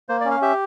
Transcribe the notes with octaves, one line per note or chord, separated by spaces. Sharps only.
A#3 C5
D5
C#4
F5
G4 E5